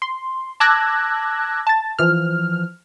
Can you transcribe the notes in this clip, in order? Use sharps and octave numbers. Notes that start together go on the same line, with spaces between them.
C6
A5 D6 E6 F#6 G#6 A#6
A5 A6
E3 F3 F6